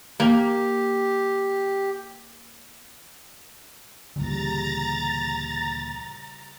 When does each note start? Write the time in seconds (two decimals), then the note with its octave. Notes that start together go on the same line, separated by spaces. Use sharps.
0.20 A#3 G4
4.16 D2 A#2 C#3 E3 G3 A#5 A6